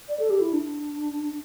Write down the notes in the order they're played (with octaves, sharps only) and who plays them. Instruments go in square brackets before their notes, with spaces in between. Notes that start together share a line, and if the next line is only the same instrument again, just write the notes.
[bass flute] D5
A4
G4
E4
D4